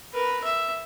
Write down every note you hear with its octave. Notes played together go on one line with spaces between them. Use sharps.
A#4 B4
E5